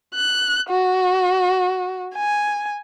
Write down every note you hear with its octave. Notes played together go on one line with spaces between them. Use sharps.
F#6
F#4
G#5